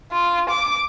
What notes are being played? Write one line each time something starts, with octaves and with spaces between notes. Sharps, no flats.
F4
D6